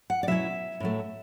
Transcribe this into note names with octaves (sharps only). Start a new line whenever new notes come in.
F#5
D5
B2 F#3 C#4 E4 E5
A2 F#3 A3